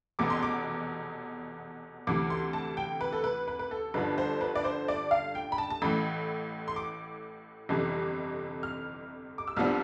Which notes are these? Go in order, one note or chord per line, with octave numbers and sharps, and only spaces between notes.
F1 E2 B2 B3 D6
C6
D6
D2 C3 E3 D6
C6
A5
G5
B4
A4
B4
B4
B4
A4
G1 G2 D3 F3 B4
C5
B4
D5
C5
D5
F5
G5
B5
A5
A5
A1 A2 E3 B5
C6
D6
G1 F2 C3 E3
F6
D6
E6
C2 C3 F3 B3 D4 F6